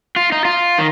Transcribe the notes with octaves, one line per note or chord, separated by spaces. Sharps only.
F4
D#4
F4
D#3